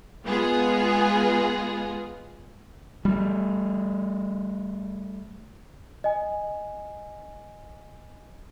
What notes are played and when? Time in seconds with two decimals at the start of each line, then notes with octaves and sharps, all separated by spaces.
0.24 G#3 B3 F4 G#4
3.05 G3 A3
6.04 D#5 G#5